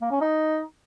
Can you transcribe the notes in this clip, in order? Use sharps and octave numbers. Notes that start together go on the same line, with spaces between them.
A#3
C#4
D#4